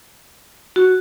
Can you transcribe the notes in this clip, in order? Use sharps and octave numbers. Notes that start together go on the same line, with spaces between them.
F#4